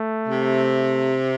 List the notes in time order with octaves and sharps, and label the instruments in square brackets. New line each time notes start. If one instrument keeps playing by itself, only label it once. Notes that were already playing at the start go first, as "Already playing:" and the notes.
Already playing: [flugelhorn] A3
[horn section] C3